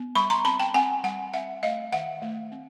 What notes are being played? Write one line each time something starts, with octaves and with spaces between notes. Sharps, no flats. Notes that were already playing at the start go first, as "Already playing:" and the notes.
Already playing: B3
G3 B5 C#6
A#5 C6
C4 A5 B5
G5 A5
C4 F#5 G#5
G3 F#5 G#5
C4 E5 F#5
A3 D#5 F5
D#3 E5 F#5
A3
C4